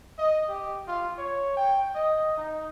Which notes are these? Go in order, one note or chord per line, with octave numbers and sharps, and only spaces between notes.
D#5
G4
F4
C#5
G5
D#5
D#4